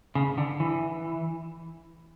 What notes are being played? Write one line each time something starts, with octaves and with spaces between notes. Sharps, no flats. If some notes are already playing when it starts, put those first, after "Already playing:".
C#3
D3
E3